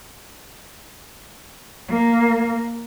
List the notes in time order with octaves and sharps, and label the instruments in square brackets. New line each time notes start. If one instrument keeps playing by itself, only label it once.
[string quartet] A#3